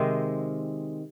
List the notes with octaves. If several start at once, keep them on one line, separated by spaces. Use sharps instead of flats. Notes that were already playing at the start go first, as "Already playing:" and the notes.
Already playing: C3 D#3 G#3 C4